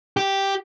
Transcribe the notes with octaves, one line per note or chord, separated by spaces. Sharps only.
G4